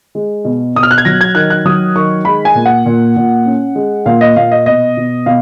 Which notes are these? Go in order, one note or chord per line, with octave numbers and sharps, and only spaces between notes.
G#3
B2
B2 D#6
F6
F#6
G#6
F#3 A#6
G#6
D#3 F#6
F#6
F#3 D#6
D#3 C#6
G#3 B5
G#5
A#2
F#5
A#2
A#2
C#4
G#3
A#2 F5
D#5
A#2 F5
D#5
B2 D#5
B2
B2 F5